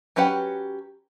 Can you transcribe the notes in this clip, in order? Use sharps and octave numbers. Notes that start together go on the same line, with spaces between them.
F#3 C#4 G4 B4 F#5